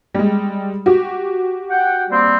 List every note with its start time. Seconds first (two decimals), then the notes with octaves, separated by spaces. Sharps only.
0.14 G3 G#3
0.86 F#4 G4
1.70 F#5 G5
2.10 G3 A#3 C4